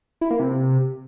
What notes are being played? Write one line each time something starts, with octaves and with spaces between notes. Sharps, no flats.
E4
A#3
C3